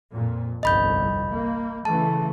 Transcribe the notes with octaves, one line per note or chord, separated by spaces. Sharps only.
F2 A#2
G1 C2 F2 D#5 B5 G6
A#3
C#3 E3 A3 A5